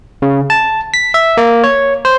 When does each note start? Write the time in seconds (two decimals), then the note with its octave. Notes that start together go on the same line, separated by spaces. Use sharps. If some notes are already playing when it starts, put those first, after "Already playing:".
0.22 C#3
0.50 A5
0.94 B6
1.14 E5
1.37 A#3
1.64 C#5
2.05 C5